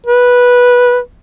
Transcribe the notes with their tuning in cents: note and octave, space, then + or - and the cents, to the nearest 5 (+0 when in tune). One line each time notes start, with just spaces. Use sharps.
B4 -10